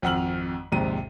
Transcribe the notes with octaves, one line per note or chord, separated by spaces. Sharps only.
G#1 F2 F#5 E6 F6 F#7
A#1 D#2 G#2 C3 D#7